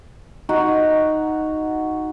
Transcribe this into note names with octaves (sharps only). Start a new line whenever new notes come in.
D#4 F#4 F#5 A#5